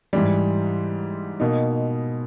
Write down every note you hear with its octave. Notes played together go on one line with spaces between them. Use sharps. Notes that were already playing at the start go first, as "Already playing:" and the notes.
G#2 E3 G3
B2 A#3 D#4